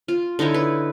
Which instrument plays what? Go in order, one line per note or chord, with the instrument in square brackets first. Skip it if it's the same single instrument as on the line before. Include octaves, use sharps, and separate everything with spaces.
[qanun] F4
D3 D#4 E4 C#5
B4